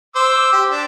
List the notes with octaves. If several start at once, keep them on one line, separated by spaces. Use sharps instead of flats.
C5 D6 E6
G4
D4